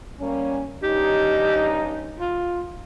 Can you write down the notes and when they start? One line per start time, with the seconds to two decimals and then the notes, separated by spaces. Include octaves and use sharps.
0.19 G3 A#3 C#4
0.83 G2 C#4 D#4 G4
2.19 F4